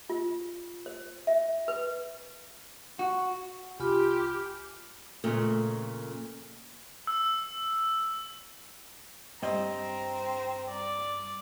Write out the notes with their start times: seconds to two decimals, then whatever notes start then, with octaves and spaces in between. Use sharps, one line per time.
0.10 F4
0.86 C5
1.27 E5
1.68 B4
2.99 F#4
3.80 C2 F4 G4 G#5 B5 F6
5.24 F2 A#2 C#3 A3
7.07 E6
9.43 G2 C4 D#5 A#5
10.69 D5